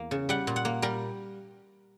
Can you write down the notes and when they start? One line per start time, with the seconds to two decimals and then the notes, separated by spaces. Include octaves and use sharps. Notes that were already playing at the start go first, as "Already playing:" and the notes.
Already playing: E2 A#3
0.11 C#3
0.29 G3 F#5
0.47 A#2
0.56 F#5
0.65 A#3
0.82 G3 A#4